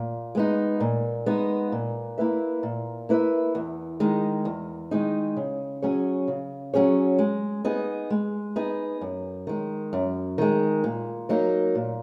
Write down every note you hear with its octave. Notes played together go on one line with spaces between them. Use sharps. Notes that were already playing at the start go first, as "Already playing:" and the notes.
Already playing: A#2
G#3 B3 D#4
A#2
G#3 B3 D#4
A#2
A#3 E4 B4 E5
A#2
A#3 E4 B4 E5
E2
D#3 G#3 D#4
E2
D#3 G#3 D#4
C#3
F#3 C#4 G#4 C#5
C#3
F#3 C#4 G#4 C#5
G#3
B3 D#4 G#4 D#5
G#3
B3 D#4 G#4 D#5
F#2
D#3 G#3
F#2
D#3 G#3
A#2
F#3 A#3 D#4 A#4
A#2